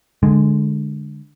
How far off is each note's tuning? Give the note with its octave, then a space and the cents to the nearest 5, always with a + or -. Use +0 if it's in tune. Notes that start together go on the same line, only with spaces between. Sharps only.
D3 +0 G#3 +5